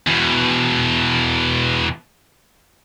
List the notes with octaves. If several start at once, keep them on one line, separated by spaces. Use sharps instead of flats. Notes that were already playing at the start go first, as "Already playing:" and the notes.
E2 B2